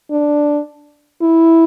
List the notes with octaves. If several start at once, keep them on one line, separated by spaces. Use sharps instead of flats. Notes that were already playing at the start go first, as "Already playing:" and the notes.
D4
E4